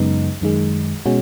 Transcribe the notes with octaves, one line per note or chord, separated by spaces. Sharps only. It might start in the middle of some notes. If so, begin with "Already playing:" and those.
Already playing: F#2 C#3 G#3 B3 D#4
F#2 D#3 G#3
B2 G#3 C#4 F#4